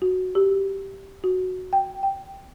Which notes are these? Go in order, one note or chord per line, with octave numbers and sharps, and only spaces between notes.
F#4
G4
F#4
G5
G5